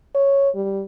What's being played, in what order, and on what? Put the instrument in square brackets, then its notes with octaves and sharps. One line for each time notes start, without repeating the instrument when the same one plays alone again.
[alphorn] C#5
G3